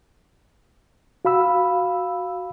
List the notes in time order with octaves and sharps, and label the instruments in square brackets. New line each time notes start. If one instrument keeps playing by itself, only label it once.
[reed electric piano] F#4 F5 B5 E6